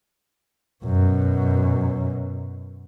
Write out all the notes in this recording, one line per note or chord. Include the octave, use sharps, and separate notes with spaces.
F#2 B2